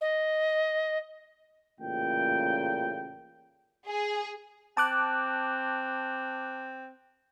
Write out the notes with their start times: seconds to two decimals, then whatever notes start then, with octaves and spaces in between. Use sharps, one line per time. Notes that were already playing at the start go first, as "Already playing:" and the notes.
0.01 D#5
1.80 A1 A#2 C#3 G5
3.88 G#4
4.77 C4 A5 D6 F#6